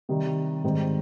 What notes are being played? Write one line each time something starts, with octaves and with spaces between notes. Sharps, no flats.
C3 D#3 G3
G#2 D#3 G3 C4